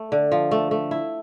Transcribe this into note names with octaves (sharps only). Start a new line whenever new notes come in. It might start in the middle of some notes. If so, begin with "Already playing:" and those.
Already playing: A3
D3
F3
A3
A3
E4